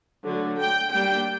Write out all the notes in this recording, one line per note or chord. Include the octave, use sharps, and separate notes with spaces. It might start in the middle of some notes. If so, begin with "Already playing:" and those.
D3 F#3 A3
G5
G3 A#3 D4 G5